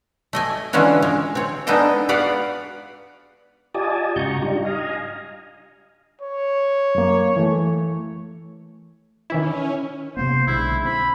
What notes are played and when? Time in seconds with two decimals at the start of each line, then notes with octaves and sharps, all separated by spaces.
0.33 A3 D#5 G#5
0.73 D3 E3 G#3 C#4 F4 F#4
1.02 G#3
1.35 C4 C#5
1.67 G#3 B3 D4 D#4 A4 D#5
2.09 B3 B4 D5 F5 F#5
3.75 F4 G4 D5 D#5 G#5 A5
4.16 G#2 C#3 F#4 A#5 C#6 G6
4.41 G3 D4 D#4 F4 G4
4.65 D#5 F5 G#5 A#5
6.22 C#5
6.95 F#2 A#3
7.36 E3 A3
9.30 D#3 E3 C#4 E4
10.17 C3 A#3 B3 C5
10.47 B1 D3 G#3 E4
10.85 C4 B5